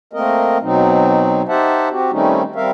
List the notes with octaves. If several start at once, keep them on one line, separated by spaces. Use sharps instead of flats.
A3 A#3 C4 A#4 D#5
B2 F#3 C4 D#4
D#4 G4 C5 E5 F#5 A5
C4 F#4 G4
D#3 G3 A3 C4 C#4 D#4
G3 C4 A#4 E5 F5